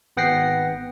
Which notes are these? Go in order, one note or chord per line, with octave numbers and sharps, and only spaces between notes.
G#1 B3 F#5 G5 A#6 C7